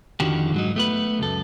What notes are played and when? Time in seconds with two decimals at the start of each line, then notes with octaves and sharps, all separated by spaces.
0.20 F2 D3 D#3 F3 F#4 G4
0.54 G#2 F#3 D#4
0.76 A3 B3 B4
1.19 C#2 F#2 A4